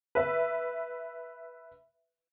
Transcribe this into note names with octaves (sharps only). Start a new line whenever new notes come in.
B4 E5